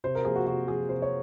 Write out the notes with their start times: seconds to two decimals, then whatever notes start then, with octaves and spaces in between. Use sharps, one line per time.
0.04 C3 C5
0.15 A#4
0.25 F3 A#3 G#4
0.36 F#4
0.46 C3 F#4
0.68 F3 A#3 G#4
0.89 C3 C5
1.02 C#5